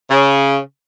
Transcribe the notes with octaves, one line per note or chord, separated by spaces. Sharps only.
C#3